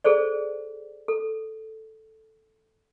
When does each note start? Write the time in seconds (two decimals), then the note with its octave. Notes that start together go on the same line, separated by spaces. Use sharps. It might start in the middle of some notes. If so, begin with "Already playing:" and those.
0.04 G#4 A4 C5 D5
1.08 A4